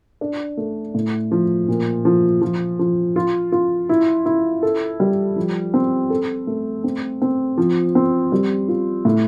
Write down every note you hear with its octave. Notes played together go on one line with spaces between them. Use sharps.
D4
A3
A2
F3
A#2
F3
F3
F3
F4
F4
E4
E4
A4
G3
F3
C4
A4
A3
C4
C4
F3
C4
G3
F4
A2